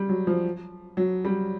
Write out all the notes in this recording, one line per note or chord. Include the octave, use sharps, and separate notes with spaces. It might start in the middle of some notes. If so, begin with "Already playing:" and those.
Already playing: G3
F#3
F3
F#3
G3